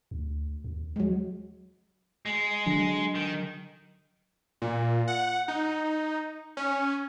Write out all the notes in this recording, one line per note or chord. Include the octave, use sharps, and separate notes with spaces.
D2
D#2
F#3 G#3
G#3
D3 F#3 D4
D#3
A#2
F#5
D#4
C#4